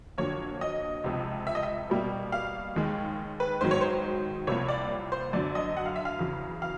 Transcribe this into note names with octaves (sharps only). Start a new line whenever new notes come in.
F2 D3 F#3 A#3 C#5
D#5
C#2 C3 F3
E5
D#5
E5
B2 G3 A#3
F5
D#2 D#3 G#3
B4
G#2 D#3 F#3 C5
C#5
C5
C2 C3 F3 A#3 C#5
D5
C5
F#2 D3 F#3 D5
D#5
F#5
F5
E5
F5
E2 C#3 F#3
F5